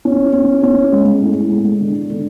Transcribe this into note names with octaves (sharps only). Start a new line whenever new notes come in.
C#4
C#4
C#4
G#3
A2
G#3
D3
D3